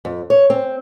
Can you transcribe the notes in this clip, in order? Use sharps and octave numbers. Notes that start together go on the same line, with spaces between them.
F2
C#5
C4